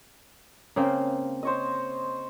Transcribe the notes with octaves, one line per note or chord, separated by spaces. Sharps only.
C#3 A#3 C4
C5 C#5 D#5